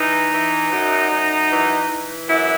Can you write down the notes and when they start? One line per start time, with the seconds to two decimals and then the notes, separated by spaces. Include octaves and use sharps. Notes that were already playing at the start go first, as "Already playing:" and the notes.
Already playing: E3 D#4
0.33 E3
0.72 F#2
1.11 F#2
1.50 E3
1.90 E3
2.29 F#2 E4